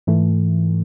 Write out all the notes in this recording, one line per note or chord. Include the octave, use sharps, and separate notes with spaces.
G#2 E3 A3